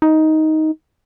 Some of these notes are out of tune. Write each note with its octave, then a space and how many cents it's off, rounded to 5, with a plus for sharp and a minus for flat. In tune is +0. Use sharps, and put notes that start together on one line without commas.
D#4 +10